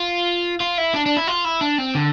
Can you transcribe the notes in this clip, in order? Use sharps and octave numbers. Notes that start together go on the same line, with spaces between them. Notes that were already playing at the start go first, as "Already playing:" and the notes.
Already playing: F4
F4
E4
D4
D4
E4
F4
E4
D4
C4
D3